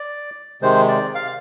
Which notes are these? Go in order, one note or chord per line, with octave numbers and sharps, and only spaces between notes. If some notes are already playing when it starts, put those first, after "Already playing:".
Already playing: D5
C3 D#3 G#3 C5
D5
F5